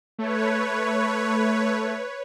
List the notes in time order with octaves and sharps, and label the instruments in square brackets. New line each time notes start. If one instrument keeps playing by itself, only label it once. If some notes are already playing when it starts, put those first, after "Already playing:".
[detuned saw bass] A3 [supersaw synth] B4 C#5